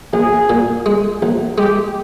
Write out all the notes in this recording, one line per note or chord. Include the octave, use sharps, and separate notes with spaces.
A#1 G#4
A#2
G#3
A#1
G#3 G4